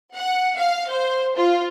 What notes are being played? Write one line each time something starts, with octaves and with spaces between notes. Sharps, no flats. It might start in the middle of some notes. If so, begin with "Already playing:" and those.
F#5
F5
C5
F4